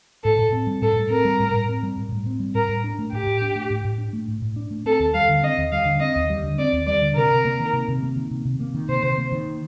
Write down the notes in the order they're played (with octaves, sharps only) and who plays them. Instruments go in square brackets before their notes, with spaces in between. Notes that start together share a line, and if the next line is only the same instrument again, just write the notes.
[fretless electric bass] A2 [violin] A4
[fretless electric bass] A2
C4
G3
[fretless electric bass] A2 [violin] A4
[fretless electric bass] A2
[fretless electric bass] C4 [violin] A#4
[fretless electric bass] G3
A2
A2
C4
G3
A2
A2
C4
G3
[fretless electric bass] A2 [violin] A#4
[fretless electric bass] A2
D4
A3
[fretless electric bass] A2 [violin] G4
[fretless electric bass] A2
D4
A3
A2
A2
D4
A3
A2
A2
D4
A3
[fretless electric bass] C4 [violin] A4
[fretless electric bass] D#2
[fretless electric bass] G3 [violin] F5
[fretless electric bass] D3
[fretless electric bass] C4 [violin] D#5
[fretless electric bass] D#2
[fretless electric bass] G3 [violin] F5
[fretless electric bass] D3
[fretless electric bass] C4 [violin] D#5
[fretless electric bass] D#2
G3
D3
[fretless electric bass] C4 [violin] D5
[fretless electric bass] D#2
[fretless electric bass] G3 [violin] D5
[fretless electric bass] D3
[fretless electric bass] C3 [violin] A#4
[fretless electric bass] C3
A#3
D#3
C3
C3
A#3
D#3
C3
C3
A#3
D#3
[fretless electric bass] C3 [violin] C5
[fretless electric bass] C3
A#3
D#3